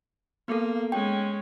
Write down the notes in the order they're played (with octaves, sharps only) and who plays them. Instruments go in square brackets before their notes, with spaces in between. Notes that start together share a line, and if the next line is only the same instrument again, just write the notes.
[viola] A#3 [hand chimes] B3 A4
[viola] G#3 C#4 [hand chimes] G5